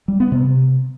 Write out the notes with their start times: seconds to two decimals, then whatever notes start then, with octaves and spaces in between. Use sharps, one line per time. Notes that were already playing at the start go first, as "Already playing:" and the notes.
0.08 G3
0.20 B3
0.32 C3